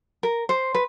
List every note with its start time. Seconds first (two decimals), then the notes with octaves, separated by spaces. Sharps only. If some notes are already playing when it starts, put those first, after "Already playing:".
0.23 A#4
0.49 C5
0.75 B4